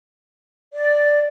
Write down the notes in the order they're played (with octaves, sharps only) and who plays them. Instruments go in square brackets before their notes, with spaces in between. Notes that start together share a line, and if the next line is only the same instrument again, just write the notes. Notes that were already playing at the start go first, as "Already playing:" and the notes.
[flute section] D5